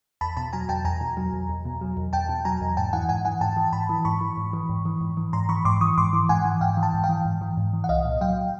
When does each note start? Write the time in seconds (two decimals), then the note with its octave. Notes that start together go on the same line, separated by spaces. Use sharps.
0.21 E2 A5 B5
0.37 B2 A5 B5
0.53 F#3 G#5 A#5
0.69 E2 G5 A5
0.85 E2 G#5 A#5
1.01 B2
1.17 F#3
1.33 E2
1.49 E2
1.65 B2
1.81 F#3
1.97 E2
2.13 E2 G5 A5
2.29 B2
2.45 F#3 G#5 A#5
2.61 E2
2.77 G#2 G5 A5
2.93 E3 F#5 G#5
3.09 G#2 F#5 G#5
3.25 E3 F#5 G#5
3.41 G#2 G5 A5
3.57 E3
3.73 G#2 A5 B5
3.89 E3
4.05 G#2 B5 C#6
4.21 E3
4.37 G#2
4.53 E3
4.69 G#2
4.85 E3
5.01 G#2
5.17 E3
5.33 G#2 A#5 C6
5.49 E3 B5 C#6
5.65 G#2 C6 D6
5.81 E3 C#6 D#6
5.98 G#2 C6 D6
6.13 E3
6.29 G#2 F#5 G#5
6.45 E3
6.61 G#2 F5 G5
6.77 E3
6.83 G5 A5
6.94 G#2
7.04 F5 G5
7.09 E3
7.25 G#2
7.41 E3
7.57 G#2
7.73 E3
7.84 F#5
7.89 C2 D#5 F5
8.05 A#2
8.21 F#3 F5 G5